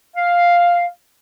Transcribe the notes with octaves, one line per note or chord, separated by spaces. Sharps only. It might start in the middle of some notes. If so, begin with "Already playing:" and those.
F5